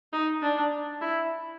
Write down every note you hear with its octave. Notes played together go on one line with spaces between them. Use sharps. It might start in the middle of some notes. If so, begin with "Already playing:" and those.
D#4
D4
E4